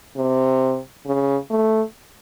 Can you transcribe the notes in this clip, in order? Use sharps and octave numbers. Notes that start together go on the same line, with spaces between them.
C3
C#3
A3